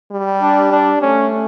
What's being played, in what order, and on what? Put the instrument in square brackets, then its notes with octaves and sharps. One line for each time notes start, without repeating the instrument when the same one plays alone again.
[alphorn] G3
[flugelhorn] D4
D4
[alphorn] A3 [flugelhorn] C#4